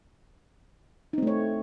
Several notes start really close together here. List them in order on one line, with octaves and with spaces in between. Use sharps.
D#4 C4 A3 C#5